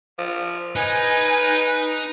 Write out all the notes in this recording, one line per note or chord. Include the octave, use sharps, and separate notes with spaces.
F3
D#4 B4 G#5